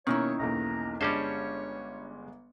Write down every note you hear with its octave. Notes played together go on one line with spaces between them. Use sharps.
B2 D#3 A#3 C#4 D#4 E4 C#5
B1 E2 A#3 A#5
G1 G3 G#3 C#4 D4 C5 C#5 C#7